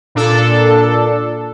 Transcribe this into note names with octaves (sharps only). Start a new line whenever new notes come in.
A#2 D4 A4